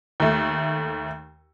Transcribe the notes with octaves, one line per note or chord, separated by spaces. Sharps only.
D#2 A3